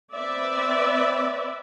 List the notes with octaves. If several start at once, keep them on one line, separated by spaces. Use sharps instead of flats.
C4 B4 D5 E5